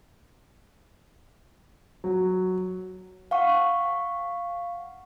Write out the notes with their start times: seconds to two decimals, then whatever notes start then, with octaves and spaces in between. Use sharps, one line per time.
2.04 F#3
3.31 F5 F#5 C#6